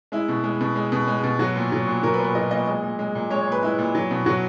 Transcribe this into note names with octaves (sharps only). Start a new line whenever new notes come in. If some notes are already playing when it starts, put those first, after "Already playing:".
G#3 E4
B2
G#3
B2
G#3
B2
G#3
B2
F#3 F#4
A#2
F#3
A#2
F#3 A#4
B4
A#2
B4
F#3 D#5
A#2 D#5
G#3 D#5
A#2
G#3
A#2
G#3 C#5
C#5
A#2 B4
G#3 E4
A#2
F#3
B2
F#3 F#4